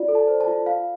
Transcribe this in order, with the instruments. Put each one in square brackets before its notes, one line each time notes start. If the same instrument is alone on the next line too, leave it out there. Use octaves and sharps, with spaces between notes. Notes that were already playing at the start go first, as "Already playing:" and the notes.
Already playing: [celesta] F4 D5
A4
A5
C5
A5
F4
F4 F5